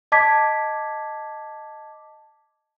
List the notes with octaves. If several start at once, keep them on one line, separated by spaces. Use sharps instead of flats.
D#5 A5 D6 G#6 B6